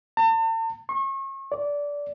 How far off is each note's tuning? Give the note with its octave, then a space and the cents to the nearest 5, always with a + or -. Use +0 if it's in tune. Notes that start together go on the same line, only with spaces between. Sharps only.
A5 +45
C#6 -35
D5 -20